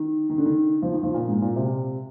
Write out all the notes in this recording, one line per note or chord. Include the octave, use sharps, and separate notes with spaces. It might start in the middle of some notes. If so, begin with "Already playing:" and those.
Already playing: D#3
D#3
D3
D#3
F3
D#3
F3
A#2
G#2
A#2
C3